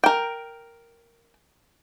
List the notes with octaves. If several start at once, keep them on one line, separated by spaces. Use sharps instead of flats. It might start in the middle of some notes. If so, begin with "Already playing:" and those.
A#4 G5